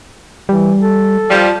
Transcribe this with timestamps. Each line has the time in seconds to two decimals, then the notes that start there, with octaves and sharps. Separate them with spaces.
0.49 E3 G3
0.81 A4
1.29 F3 G3